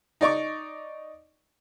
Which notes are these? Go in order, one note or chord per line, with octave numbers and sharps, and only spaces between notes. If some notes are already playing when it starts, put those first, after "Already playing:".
D#4 D5 C#6 D6